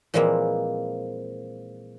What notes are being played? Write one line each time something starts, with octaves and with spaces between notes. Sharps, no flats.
A#2 E3 F3 G#3 A#3 C4